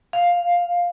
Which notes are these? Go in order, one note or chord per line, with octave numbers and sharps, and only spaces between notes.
F5